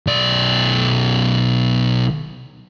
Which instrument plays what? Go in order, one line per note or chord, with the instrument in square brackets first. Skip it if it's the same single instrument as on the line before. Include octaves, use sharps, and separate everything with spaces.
[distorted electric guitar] B1 D5